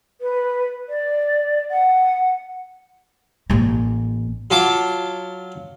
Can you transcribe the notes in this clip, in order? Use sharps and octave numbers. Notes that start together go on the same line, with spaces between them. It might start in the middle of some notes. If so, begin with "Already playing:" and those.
B4
D5
F#5
A1 A#3
F#3 F4 A5 D6